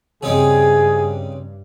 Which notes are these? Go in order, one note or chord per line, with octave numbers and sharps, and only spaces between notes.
G2 C#3 C4 D#4 G#4